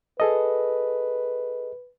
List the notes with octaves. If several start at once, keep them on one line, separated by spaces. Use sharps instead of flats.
G#4 A4 B4 D#5